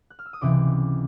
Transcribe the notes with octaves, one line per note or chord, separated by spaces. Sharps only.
F#6
F6
E6
D#6
C#2 C3 E3 D6